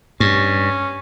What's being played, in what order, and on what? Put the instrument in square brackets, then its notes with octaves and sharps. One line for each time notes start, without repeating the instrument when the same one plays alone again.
[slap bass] G2 [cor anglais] C#4